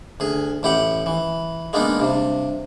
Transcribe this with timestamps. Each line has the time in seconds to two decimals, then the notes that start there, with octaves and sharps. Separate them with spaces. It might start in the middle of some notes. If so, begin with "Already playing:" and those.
0.20 D2 G#4
0.63 A1 E4 G4 F#5
1.06 E3
1.73 G#3 A#3 B3 D4 D#4
1.99 G2 C3